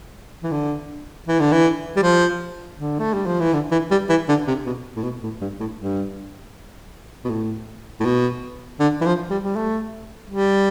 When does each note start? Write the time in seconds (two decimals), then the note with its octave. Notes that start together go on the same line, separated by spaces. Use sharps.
0.43 E3
0.52 D3
1.28 E3
1.40 D3
1.52 E3
1.96 G3
2.03 F3
2.77 D3
2.99 A3
3.14 G3
3.26 F3
3.40 E3
3.53 D3
3.71 E3
3.91 G3
4.09 E3
4.29 D3
4.48 C3
4.66 B2
4.96 A2
5.03 B2
5.23 A2
5.41 G2
5.60 A2
5.79 G2
7.25 B2
7.30 A2
8.00 A2
8.05 B2
8.80 D3
9.01 E3
9.06 F3
9.30 G3
9.43 G3
9.56 A3
10.30 G3